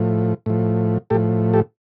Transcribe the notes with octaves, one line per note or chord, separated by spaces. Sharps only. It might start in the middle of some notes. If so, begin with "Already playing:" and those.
Already playing: A2 F3
A2 F3
A2 F3 G4 A4
G4 A4